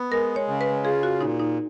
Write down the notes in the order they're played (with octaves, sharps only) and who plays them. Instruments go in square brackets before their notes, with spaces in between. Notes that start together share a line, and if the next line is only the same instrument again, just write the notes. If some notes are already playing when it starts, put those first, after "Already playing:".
Already playing: [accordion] B3
[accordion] G#3 [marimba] A#4
[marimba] C#5
[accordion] C#3
[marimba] B4
[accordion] F4 [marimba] G#4
[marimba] F#4
[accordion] A#2 [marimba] D#4
[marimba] D#4